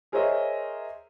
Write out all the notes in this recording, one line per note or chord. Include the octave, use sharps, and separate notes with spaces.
G#4 A#4 C5 C#5 D#5 E5